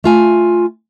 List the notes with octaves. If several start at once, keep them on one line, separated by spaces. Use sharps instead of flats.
A3 F4 G#5